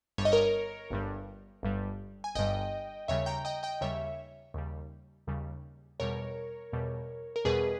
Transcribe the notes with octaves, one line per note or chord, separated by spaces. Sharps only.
G1 G2 G3 C#5
D#5
A#4 C#5
G1 G2 G3
G1 G2 G3
G#5
G1 G2 G3 D#5 G5
D#2 C#3 G3 C#5 E5
G5 A#5
D#5 G5
D#5 G5
D#2 C#3 G3 C#5 E5
D#2 C#3 G3
D#2 C#3 G3
E2 B2 G3 A#4 C#5
E2 B2 G3
A#4
E2 B2 G3 G#4 B4